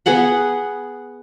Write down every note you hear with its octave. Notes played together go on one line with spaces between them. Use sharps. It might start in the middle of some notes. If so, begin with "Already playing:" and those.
B3 G#4 F#5 B5